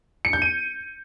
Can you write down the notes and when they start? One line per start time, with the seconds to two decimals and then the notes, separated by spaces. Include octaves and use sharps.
0.25 C#7
0.33 G6
0.42 D#7